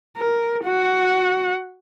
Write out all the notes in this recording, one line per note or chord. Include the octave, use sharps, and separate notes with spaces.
A#4
F#4 F#5